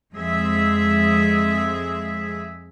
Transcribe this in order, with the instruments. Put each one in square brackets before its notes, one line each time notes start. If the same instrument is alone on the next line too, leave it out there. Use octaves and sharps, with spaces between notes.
[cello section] F2 G#3 G#4 E5